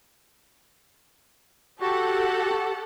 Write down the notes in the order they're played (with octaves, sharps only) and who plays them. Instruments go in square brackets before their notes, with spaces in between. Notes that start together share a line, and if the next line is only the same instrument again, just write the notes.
[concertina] F#4 [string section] G4 A4 F#5